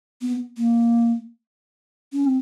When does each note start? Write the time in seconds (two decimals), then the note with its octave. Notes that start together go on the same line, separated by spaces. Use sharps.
0.21 B3
0.57 A#3
2.13 C#4
2.24 C4